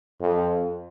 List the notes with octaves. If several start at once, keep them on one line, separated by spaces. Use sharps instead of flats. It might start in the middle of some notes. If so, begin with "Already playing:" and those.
F2